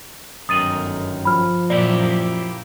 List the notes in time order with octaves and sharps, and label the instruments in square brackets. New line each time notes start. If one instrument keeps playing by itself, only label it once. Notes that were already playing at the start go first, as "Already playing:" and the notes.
[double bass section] G1 [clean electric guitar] F#2 D#3 [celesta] D#6 A6 D#7
[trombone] F3 [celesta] B5 F6
[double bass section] F#2 A#2 [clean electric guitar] A#3 E4 G4 [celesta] D5